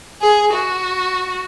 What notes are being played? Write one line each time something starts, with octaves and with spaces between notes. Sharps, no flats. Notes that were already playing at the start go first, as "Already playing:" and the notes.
G#4
F#4